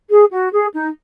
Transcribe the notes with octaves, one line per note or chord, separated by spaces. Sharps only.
G#4
F#4
G#4
D#4